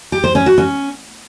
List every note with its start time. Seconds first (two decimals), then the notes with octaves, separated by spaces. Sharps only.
0.12 G4
0.24 C5
0.35 C#4
0.46 F#4
0.58 C#4